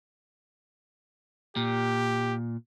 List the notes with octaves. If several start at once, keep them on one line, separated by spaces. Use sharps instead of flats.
A#2 G4